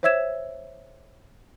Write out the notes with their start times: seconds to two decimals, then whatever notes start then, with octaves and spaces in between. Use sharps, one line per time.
0.03 C5 C#5 E5 E6 G#6 E7